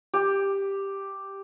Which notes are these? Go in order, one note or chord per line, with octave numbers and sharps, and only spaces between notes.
G4